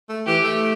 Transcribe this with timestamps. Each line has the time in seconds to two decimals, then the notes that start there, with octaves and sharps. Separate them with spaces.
0.09 A3
0.26 E3 G4
0.44 A3